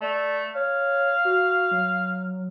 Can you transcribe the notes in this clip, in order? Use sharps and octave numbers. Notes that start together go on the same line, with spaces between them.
A3 D5
C#5 F5
F#4
F#3